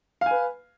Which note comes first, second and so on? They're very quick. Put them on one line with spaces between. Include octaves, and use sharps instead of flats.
F5 G#5 B4